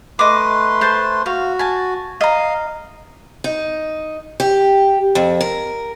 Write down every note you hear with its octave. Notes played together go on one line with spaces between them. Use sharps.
A3 B4 D#5 C6 D6
C5 A5
F#4 F5
G#5 A5
D#5 F5 A#5
D#4
G4
F2
A#4